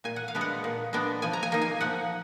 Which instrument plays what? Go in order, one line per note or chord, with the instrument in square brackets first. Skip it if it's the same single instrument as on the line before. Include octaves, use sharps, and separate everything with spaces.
[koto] A#2 G#5
F#5
F5
G#3 B3 D4
F#5
A#2
G#3 B3 D4
F3 G#5
A#5
G#5
A#3 D#4
G#5
F3 F#5